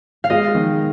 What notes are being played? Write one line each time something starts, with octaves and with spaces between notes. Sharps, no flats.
F5
G#3 D#5
D#3